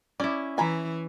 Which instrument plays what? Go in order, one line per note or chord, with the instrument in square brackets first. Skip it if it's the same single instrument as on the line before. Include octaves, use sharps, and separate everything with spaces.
[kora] C#4 E4 [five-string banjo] D5
[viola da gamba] E3 [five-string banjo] G#5 A#5 B5